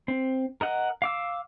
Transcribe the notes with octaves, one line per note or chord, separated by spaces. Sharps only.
C4
A#4 D#5 F#5
F5 D6 E6